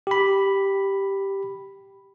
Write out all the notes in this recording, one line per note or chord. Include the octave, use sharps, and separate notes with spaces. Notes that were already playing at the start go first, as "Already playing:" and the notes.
G4 B5